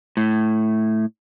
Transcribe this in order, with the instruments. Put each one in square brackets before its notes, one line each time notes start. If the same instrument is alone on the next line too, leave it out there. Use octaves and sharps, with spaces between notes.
[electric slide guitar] A2